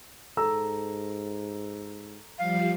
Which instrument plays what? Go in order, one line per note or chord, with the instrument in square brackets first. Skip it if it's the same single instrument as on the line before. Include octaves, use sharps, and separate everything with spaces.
[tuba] G#2 [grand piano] A4 A#5 E6
[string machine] F3 G3 [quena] F5